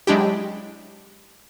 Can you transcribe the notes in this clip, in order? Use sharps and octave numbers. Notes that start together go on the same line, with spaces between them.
F#3 G#3 D4 E4 G4